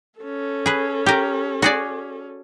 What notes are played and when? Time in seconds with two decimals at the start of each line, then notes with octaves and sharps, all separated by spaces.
0.20 C#4 A4
0.66 G#4 B4
1.06 G4 A#4
1.62 F#4 G#4 D5